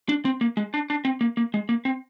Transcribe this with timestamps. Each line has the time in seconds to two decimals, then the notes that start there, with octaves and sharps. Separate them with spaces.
0.09 D4
0.25 C4
0.41 A#3
0.57 G#3
0.74 D4
0.90 D4
1.05 C4
1.21 A#3
1.37 A#3
1.54 G#3
1.69 A#3
1.85 C4